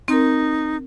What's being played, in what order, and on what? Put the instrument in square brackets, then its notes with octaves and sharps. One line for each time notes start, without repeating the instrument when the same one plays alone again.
[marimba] C4 A#4 [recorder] D#4